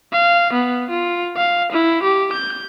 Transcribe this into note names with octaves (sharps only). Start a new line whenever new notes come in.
F5
B3
F4
F5
E4
G4
G6